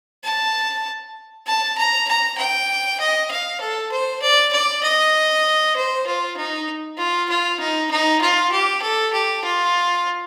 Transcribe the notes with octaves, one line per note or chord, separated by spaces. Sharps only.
A5
A5
A#5
A#5
G5
D#5
F5
A4
C5
D5
D5
D#5
C5
F4
D#4
F4
F4
D#4
D#4
F4
G4
A4
G4
F4